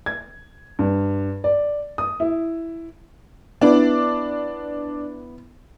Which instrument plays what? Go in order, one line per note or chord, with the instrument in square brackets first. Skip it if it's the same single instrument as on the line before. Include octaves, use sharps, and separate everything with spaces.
[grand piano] G#6
G2
D5
D#6
E4
[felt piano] B3 E4 [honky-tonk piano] D4 D5